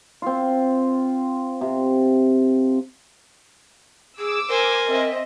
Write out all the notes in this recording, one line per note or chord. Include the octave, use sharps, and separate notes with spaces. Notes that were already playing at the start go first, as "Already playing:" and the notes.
C4 F4
C3
G#4 D6 E6
A#4 C5 G#5
C4 D#5 E5